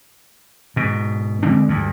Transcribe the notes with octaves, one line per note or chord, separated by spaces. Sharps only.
G#2 B2
D3 G#3 C4 D4
D2 G2